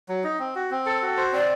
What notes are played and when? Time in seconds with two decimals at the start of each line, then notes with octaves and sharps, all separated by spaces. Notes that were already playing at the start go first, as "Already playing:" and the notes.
0.09 F#3
0.24 D#4
0.39 C4
0.55 F#4
0.71 C4
0.86 A4
1.02 F#4
1.17 C5
1.32 C4 D5